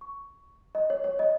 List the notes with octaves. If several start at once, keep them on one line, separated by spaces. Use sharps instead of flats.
C#6
D#5
C#5
C#5
D#5